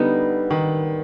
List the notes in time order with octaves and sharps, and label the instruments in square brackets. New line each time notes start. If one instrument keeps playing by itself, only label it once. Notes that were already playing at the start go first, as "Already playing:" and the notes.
Already playing: [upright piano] D3 [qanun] G3 B3 D#4
[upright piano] D#3